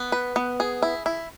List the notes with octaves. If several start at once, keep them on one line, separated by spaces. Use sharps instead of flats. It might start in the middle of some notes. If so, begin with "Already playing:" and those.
Already playing: B3
B4
B3
G#4
E4
E4